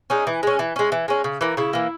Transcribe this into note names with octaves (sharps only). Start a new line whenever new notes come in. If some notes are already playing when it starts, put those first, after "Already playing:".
G#3 C#4 D#4
E3
G#3 C#4
E3
G#3 C#4
E3
G#3 C#4
C#3
E3 A#3
C#3 E4
E3 A#3